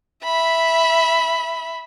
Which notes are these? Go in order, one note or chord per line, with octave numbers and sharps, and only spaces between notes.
E5 B5